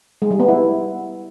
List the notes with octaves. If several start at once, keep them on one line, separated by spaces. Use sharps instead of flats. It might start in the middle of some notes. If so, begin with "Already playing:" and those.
G#3
G3
B3
E4